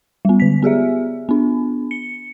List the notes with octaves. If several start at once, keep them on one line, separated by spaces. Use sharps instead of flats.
G3 B3
D3 B6
B3 G4 G#4 E5
B3 D4
C#7